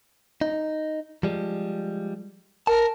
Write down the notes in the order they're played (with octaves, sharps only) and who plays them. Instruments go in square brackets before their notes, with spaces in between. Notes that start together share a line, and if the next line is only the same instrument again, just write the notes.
[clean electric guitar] D#4
F3 G3 G#3
[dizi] A#4 [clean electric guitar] A5